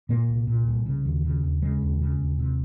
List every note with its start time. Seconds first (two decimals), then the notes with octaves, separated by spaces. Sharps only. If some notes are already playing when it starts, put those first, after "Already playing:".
0.09 A#2 A#3
0.29 C2
0.47 A#2
0.67 C2
0.86 C#3
1.05 D#2
1.25 C#3
1.44 D#2
1.62 C#3 G#3
1.82 D#2
2.01 C#3
2.20 D#2
2.39 C3